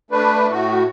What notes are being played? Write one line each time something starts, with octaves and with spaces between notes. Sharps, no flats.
A3 D4 B4
A2 A3 F#4